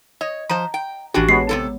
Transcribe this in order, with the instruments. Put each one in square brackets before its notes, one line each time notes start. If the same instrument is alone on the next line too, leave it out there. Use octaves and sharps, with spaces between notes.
[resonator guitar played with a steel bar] C#5 [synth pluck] D#5
[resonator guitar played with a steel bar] F3 C5 [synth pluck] A#5
[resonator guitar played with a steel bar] G5
[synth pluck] A1 G4 [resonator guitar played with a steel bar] E3 D4 F#4
[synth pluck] G#3 B3 C#5 [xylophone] C7
[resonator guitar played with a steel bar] C3 E3 A4